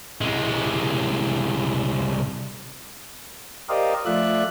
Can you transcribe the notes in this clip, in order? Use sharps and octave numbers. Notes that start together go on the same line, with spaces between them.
C2 G#3
G4 A#4 C5 D5 D#5 F5
F3 A3 F4 D5 E5 F#6